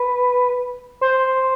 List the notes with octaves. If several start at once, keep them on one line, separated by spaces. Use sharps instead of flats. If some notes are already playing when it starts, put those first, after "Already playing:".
Already playing: B4
C5